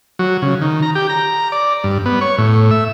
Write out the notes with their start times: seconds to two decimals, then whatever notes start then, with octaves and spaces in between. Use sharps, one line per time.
0.19 F#3
0.42 C#3
0.61 D#3
0.82 A#5
0.95 G4
1.09 A#5
1.52 D5
1.84 G2
2.06 B3
2.21 C#5
2.38 A2
2.71 E5